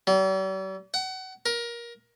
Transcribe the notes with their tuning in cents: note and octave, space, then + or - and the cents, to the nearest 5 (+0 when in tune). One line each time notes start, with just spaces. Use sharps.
G3 -45
F#5 +30
A#4 +20